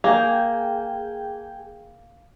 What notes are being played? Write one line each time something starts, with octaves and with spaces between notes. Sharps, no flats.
A#3 G#4 G5